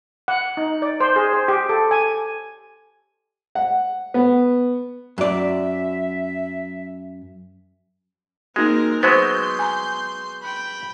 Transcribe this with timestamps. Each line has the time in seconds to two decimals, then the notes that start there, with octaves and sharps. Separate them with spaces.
0.28 F#5
0.57 D#4
0.82 D5
1.00 C5
1.16 G#4
1.33 C5
1.48 G4
1.69 A4
1.91 G#5
3.55 F#5
4.14 B3
5.18 F#2 D5 E5
8.56 G#3 A#3 C4 D#4 F#4 A#4
9.03 F#3 G#3 B3 C5 C6 G6
9.59 G#5 A#5
10.43 G5 B5